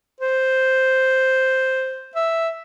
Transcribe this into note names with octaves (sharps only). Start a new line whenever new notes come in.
C5
E5